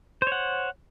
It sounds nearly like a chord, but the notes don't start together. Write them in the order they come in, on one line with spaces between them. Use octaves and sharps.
C5 C#5 F#5